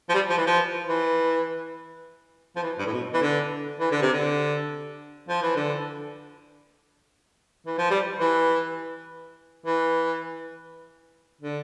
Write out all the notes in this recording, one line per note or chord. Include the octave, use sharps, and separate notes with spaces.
F3
G3
F3
E3
F3
E3
F3
E3
G2
A2
B2
E3
D3
E3
D3
C3
D3
F3
E3
D3
E3
F3
G3
E3
E3
D3